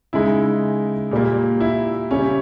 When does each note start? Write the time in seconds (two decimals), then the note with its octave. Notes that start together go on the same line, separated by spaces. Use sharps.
0.13 C#3 G#3 D#4 E4
1.11 A#2 G3 A#3
1.60 E4
2.11 C#3 G3 C#4